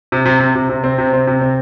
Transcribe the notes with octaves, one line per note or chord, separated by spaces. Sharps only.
C3
C3
C3
C3
C3
C4
C3
C4
C3
C4